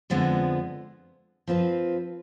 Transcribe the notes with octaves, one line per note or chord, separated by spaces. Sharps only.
F2 D3 F3 G#3 B3
F3 C4 F4 B4